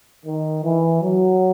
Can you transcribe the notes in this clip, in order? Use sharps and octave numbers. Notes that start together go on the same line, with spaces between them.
D#3
E3
F#3